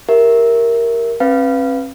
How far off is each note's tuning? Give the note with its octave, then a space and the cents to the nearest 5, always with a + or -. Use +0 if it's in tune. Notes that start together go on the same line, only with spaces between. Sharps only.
G4 +0 A#4 +0 E5 +0
C4 +45 B4 +0 F5 -20